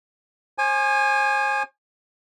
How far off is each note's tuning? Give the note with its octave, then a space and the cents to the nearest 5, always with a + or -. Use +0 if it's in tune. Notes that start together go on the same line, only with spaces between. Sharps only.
C5 +45 G#5 +0 D6 +45